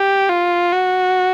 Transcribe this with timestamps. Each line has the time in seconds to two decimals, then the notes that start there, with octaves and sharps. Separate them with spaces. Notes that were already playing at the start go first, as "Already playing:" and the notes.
Already playing: G4
0.29 F4
0.73 F#4